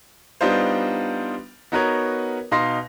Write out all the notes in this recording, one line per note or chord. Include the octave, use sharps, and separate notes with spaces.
G3 B3 D4 D#4 F4 C5
B3 D#4 F#4 A#4 B4 C#5
B2 D#4 F5 C6 A#6